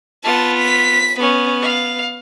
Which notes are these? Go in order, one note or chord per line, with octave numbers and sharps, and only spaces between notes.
B3 F4 A5
B6
B3 C#4
F5